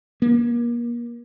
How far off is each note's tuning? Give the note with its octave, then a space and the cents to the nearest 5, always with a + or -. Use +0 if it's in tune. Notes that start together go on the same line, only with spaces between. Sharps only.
A#3 +35